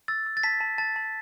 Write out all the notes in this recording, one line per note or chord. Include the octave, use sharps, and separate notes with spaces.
E6 A6
E6
A6
A5 B6
A5
A5 A6
A5